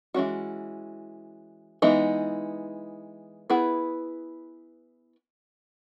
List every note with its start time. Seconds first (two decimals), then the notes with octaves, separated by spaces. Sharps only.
0.14 E3 G#3 C#4 F#4
1.82 E3 G#3 B3 D#4
3.50 B3 E4 G#4 B4